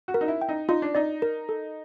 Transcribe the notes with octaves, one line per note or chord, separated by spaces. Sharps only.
F#4
A#4
D#4
E4
G5
D#4
D#4 F4
D4
D#4 D5
A#4
A4